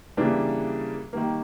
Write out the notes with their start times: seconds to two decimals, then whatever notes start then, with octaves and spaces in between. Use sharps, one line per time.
0.17 C#3 E3 G3 A#3 D4
1.13 D#3 G3 A#3